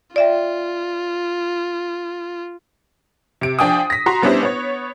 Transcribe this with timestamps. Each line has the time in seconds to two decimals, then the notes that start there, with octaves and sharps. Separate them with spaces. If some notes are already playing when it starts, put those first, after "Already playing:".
0.16 F4 D5 E5 G5
3.41 C3 D7
3.59 F3 D4 G5 G#5 D#6
3.90 A#6 B6
4.06 F#4 A#5 C6
4.22 G3 B3 C#4 D4 E4 C5
4.43 B3 C#5